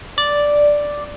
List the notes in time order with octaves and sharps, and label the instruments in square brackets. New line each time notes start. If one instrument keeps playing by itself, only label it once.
[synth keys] D5